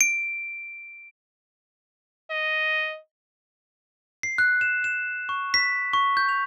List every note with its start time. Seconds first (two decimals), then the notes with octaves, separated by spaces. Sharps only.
0.01 D7
2.31 D#5
4.23 C7
4.38 F#6
4.61 E7
4.84 E7
5.29 C#6
5.54 B6
5.93 C#6
6.17 G6
6.29 F7